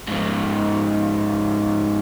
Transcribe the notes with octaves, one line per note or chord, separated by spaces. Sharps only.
G#2 F3